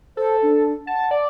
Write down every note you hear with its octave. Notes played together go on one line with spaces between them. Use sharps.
A4 C5
D4
F#5 A5
D5